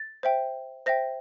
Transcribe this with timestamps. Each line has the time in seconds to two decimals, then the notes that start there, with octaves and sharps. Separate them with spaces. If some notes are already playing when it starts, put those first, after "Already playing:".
Already playing: A6
0.23 C5 E5 G5
0.86 C5 E5 G5 A#6